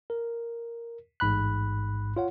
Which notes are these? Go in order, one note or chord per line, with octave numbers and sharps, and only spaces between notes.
A#4
A1 G#2 B5 F#6
F4 C#5 F#5